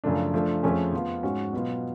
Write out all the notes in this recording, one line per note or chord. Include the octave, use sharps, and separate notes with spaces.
F#2 C#3 F3 A3 D4
F3 A3 D4
F2 F3 A3 C#4 G#4
F3 B3 F4
G#2 G#3 C#4 F#4
B2 F#3 B3 F4